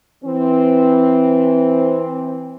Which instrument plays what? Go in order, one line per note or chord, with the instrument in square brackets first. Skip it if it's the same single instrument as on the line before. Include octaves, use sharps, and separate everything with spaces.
[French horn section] E3 C4